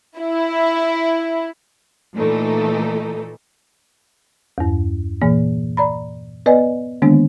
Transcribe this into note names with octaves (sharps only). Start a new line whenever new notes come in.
E4
A#2 E3 A3 D#4 A4
E2 G2
A#2 E3 A#3
D5 A#5 B5
B3 B4 D5 D#5 G#5
D3 D#3 G#3 A#3 B3 D4